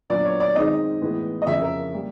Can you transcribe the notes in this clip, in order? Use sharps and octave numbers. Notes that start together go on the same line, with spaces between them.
A#2 F#3 B3 D4 D5
C#5
D5
D#3 G#3 C4 D#4 D#5
A2 E3 G#3 B3
D#5
F2 C#3 F3 E5
A#4
G3 A#3